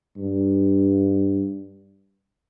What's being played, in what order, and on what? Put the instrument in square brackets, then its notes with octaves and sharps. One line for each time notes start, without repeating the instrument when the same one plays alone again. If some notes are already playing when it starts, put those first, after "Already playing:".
[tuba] G2